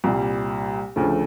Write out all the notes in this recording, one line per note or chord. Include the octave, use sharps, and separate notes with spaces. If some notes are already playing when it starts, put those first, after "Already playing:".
C2 A#2 G3
D2 C#3 F3 A3